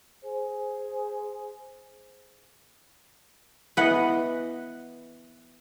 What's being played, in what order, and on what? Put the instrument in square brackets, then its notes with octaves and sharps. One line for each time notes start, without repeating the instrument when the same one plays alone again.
[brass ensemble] G#4 C5
[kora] E3 B3 D#5 [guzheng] B4 F#5